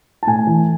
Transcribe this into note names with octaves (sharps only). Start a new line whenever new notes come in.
A5
A2 G#5
E3